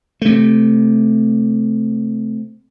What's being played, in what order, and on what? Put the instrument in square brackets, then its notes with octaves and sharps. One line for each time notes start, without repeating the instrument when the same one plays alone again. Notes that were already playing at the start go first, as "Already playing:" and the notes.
[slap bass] C3 A3